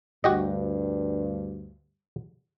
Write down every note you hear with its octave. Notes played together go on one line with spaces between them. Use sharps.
D2 G2 F#4 G4 D#5